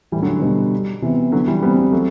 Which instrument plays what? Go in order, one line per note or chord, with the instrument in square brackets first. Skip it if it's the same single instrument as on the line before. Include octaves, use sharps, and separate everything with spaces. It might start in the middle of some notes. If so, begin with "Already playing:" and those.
[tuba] A2 [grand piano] E3 G3
[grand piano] D3 F#3
[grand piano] B2 D3 [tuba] G3
[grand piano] C3 E3 [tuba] B3
[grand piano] D3 F#3
E3 G3
[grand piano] G3 B3 [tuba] C4
[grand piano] G3 B3
F#3 A3